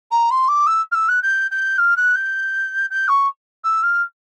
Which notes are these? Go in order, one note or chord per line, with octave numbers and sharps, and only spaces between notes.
A#5
C6
D6
E6
F6
E6
F#6
G6
G6
F6
F#6
G6
G6
C#6
E6
F6